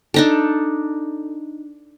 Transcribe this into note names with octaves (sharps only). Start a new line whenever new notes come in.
D4 D#4 A4